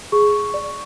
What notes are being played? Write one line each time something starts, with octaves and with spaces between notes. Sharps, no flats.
G#4 C#6
D5